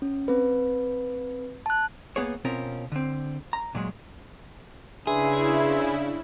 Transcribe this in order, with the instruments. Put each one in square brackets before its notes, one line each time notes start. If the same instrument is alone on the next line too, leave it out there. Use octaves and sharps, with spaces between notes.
[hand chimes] C#4
C4 B4
A5 F#6
[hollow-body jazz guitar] A#3 B3 G#4 C#5
B2 C4 C#4 F4 A#4
D3 C4
A#5
A#2 F#3 G#3
[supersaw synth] C#3 E4 [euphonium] D4 [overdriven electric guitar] G#4 [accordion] B4 E5 C6